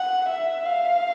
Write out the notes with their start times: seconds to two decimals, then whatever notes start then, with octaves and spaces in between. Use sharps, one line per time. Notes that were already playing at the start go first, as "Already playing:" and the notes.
Already playing: F#5
0.29 E5
0.66 F5